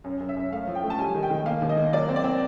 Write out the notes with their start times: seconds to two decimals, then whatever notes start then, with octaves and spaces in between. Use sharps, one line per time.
0.04 F#2
0.20 F#2
0.29 E5
0.37 F#2
0.52 A3 F5
0.67 F3
0.75 G5
0.83 A3
0.90 A5
0.99 G3 G#5
1.14 D#3
1.23 G5
1.30 D#3
1.46 A#3 F5
1.62 D#2
1.69 D#5
1.77 A#3
1.93 F#3 D5
2.09 C4
2.16 D5
2.24 C4